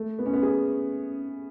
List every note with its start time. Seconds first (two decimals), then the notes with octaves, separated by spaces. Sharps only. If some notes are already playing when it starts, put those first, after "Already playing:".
Already playing: A3
0.19 B3
0.26 C#4
0.33 B3
0.43 G#4